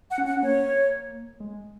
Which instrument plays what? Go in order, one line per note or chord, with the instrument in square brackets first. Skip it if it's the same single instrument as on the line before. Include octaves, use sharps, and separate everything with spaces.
[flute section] F#5
[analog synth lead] C#4
[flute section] F#5
[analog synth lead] C#4
[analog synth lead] A#3 [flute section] C#5
[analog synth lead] G#3